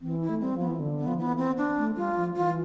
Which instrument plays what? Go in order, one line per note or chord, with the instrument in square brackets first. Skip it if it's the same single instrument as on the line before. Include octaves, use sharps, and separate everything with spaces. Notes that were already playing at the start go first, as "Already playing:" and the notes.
[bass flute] E3 [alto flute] C4
[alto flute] E4
[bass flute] A3
[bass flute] G3 [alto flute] C4
[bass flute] F3 [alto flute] B3
[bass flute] E3
D3
[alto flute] B3
[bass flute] F3
[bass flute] E3 [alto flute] B3
[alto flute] C4
D4
[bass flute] A3
[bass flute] G3 [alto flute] F4
[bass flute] F3
[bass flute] E3 [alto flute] F4